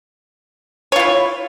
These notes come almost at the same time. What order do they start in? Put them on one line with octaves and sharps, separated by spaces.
C#5 F4 E4